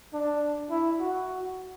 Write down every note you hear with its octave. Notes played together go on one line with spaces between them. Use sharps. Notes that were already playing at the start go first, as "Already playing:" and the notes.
D4
E4
F#4